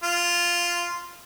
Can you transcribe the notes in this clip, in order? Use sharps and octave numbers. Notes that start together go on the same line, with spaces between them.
F4